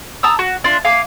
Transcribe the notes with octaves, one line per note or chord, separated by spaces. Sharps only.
A5 A#5 D#6 E6
F#4
D4 F4
F5 G#5 D6